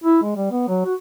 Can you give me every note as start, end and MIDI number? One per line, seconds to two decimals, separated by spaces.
0.04 0.19 64
0.23 0.36 56
0.36 0.47 55
0.52 0.63 59
0.68 0.84 54
0.85 0.94 66